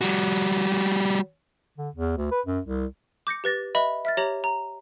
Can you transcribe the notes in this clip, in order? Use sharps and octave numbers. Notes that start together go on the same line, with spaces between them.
G3 F#4
D3
E2
D2
B4
F#2
C2
D6 G6 A#6 C#7
G4 B4 A6 A#6
B4 D#5 E5 B5
E5 F6 A6
G4 C#5 A#5 A#6 F#7
A#5